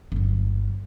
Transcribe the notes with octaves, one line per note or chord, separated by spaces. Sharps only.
G1 F#3